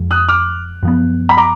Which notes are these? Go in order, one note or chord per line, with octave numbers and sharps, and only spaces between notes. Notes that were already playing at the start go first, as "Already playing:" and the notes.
Already playing: F2 F3 G#3
D#6 F#6
D6 F6
F#2 F3 B3
B5
A#5 D6